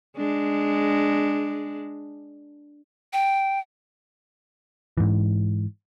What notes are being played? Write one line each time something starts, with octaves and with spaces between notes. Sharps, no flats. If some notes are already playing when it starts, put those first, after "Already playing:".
G#3 D4
G5
G#2 E3